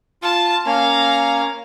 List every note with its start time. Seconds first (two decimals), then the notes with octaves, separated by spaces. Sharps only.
0.22 F4 A5
0.66 A#3 C#4 F5 A#5